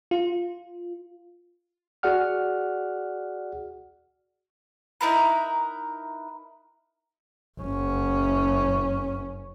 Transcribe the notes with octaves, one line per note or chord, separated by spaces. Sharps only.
F4
F#4 G#4 D5 F#5 F6
D#4 E4 A#4 B4
F#1 C#4